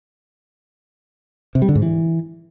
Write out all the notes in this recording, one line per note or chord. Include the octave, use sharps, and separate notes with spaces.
C3
G3
D3
G#2
E3